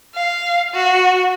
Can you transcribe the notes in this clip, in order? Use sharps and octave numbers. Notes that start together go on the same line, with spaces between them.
F5
F#4